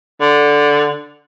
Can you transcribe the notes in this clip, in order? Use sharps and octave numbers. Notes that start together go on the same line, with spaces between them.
D3